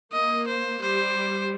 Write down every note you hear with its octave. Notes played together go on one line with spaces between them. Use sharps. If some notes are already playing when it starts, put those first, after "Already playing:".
A#3 D#5
C5
G3 C5